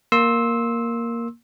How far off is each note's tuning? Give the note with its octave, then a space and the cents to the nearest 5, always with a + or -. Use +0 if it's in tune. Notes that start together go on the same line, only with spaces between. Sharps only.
A#3 +0 C6 +15 E6 -15